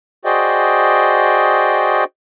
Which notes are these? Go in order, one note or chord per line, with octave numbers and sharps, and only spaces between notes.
F#4 G#4 C5 D5 D#5 G5